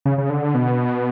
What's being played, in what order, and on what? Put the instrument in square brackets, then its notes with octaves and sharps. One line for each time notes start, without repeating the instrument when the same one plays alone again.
[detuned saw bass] C#3
C#3
D3
B2